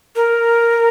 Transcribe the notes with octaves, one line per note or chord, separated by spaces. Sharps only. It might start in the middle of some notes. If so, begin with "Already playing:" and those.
A#4